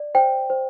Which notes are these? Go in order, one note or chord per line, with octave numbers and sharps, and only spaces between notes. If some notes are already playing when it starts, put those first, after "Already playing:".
Already playing: D5
C5 G5
C5